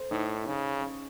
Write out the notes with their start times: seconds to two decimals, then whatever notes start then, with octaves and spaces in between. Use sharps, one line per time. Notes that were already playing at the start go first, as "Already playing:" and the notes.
Already playing: A4 C5
0.11 A2 D#4
0.47 C#3 D#4
0.81 C#4